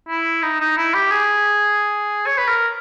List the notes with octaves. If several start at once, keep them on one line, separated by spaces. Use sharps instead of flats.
E4
D#4
D#4
E4
G4
G#4
C#5
B4
A#4